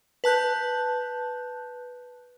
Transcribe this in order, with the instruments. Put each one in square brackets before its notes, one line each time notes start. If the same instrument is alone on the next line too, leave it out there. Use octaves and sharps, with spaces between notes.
[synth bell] B4 A5 F#6 G6